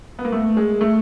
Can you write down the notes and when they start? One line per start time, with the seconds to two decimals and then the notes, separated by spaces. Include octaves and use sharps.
0.19 B3
0.25 A#3
0.32 A3
0.57 G#3
0.81 A3